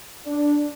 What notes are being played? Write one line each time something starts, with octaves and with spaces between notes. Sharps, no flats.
D4